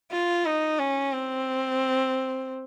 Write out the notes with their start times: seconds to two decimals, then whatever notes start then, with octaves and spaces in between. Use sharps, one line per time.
0.12 F4
0.46 D#4
0.79 C#4
1.14 C4